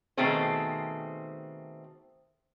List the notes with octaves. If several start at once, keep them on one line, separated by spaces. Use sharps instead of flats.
B2 D#3 A3 C4 G#4 C5